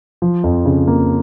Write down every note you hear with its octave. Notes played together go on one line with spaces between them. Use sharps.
F3
F2
C#3
A#3